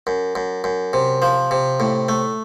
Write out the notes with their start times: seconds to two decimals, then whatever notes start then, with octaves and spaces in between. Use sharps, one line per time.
0.07 F#2
0.35 F#2
0.64 F#2
0.93 C3
1.22 F3
1.51 C3
1.80 A2
2.09 A3